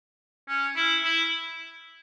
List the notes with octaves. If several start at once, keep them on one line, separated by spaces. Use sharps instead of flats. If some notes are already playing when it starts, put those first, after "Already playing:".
C#4
E4
E4